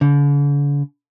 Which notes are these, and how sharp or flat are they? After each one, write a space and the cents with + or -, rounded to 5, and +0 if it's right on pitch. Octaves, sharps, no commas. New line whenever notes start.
D3 -45